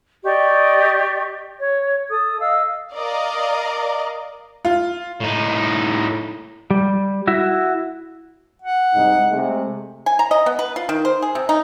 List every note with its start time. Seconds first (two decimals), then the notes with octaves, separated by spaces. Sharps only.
0.24 G4 D5 D#5 C#6
1.60 C#5
2.10 A4 D#6
2.40 D#5 F5 E6
2.93 A#4 D5 D#5 F5
4.65 F4
5.21 A2 D#4
6.71 G3
7.27 E4 F#4 E5
8.62 F#5
8.95 C2 G#2 D#4
9.31 C3 G#3 A3
10.06 G#5
10.19 A#5
10.31 D#5
10.46 B3
10.59 B4
10.76 F4
10.89 D#3
11.05 C5
11.22 G#4
11.35 C3
11.49 D#4